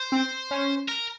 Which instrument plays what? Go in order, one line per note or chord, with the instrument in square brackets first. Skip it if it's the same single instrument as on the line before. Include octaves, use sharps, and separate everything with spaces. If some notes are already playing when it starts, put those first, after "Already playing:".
Already playing: [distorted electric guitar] C5
[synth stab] C4
C#4
[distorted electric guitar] A#4